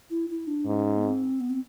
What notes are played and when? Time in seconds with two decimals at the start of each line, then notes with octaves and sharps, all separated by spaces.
0.10 E4
0.29 E4
0.47 D4
0.66 G#2 C#4
0.97 B3
1.03 C4
1.40 B3
1.50 C4